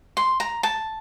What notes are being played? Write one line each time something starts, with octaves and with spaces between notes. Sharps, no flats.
C6
A#5
A5